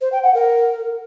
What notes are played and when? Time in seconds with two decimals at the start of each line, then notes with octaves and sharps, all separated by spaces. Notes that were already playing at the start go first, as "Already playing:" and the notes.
0.01 C5
0.12 G5
0.23 F#5
0.34 A#4